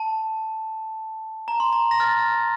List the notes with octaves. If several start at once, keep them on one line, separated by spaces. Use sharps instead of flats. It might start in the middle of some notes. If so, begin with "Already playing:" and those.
Already playing: A5
A#5
C6
A#5
A#6
F6 A6